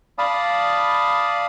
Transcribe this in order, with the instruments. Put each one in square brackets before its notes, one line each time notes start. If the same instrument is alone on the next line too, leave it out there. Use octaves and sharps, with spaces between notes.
[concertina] D5 F5 A5 B5 D#6